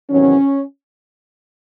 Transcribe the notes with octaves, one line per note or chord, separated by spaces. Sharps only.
E2 C3 D#3 F#3 C#4